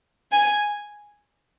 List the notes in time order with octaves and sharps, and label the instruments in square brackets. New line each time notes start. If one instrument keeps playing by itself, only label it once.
[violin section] G#5